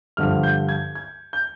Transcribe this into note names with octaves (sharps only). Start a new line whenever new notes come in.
G2 D3 F3 F6
G6
G#6
G#6
G6